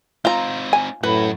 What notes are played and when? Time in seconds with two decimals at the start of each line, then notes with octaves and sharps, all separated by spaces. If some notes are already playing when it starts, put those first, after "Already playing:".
0.25 C4 D#4 F4 A#5
0.73 G#5
1.03 F#2 A2 F#4 B4